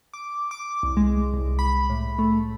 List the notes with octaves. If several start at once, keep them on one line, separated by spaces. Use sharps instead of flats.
D6
D6
C2
G#3
C2
C2
B5
A2
A3